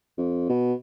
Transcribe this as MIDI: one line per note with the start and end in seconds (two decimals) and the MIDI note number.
0.18 0.44 41
0.49 0.74 47